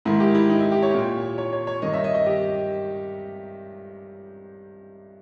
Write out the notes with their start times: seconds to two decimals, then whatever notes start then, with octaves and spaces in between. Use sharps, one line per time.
0.05 G#2 D#3 E4
0.20 G4
0.35 E4
0.50 D#4
0.61 E4
0.72 G4
0.83 C#5
0.94 A#2
1.38 C#5
1.53 C#5
1.67 C#5
1.82 G2 D#3 D#5
1.93 E5
2.04 D#5
2.15 D#5
2.26 G4